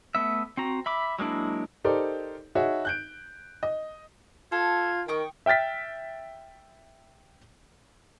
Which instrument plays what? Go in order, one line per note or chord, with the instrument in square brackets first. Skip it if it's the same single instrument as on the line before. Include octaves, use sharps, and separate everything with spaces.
[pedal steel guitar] A3 B3 E5
C4 F#4 A#5
E5 B5 D6
F#3 G#3 A#3 D4 E4
[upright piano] D#4 G4 A4 A#4 C5 D5
D#4 F#4 G#4 C#5 E5
F#6 G6 D7
D#5
[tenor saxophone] F4 [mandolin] A4 [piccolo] G#6
[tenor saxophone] D#3 [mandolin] G5 C#6 D#6
[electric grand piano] E5 G5 F6 A6 B6